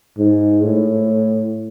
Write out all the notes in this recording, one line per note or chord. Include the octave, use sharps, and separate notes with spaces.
G#2
A2